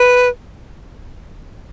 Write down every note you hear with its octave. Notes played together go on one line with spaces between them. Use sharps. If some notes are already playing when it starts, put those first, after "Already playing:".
Already playing: B4